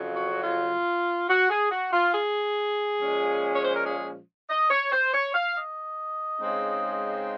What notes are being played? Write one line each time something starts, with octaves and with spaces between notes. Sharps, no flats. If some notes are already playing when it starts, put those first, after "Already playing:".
Already playing: F2 C#3 F#3 C#4
F#4
F4
F#4
G#4
F#4
F4
G#4
A#2 F3 G#3 C#4
C#5
C5
A#4
G#4
D#5
C#5
C5
C#5
F5
D#5
C#3 G#3 C4 D#4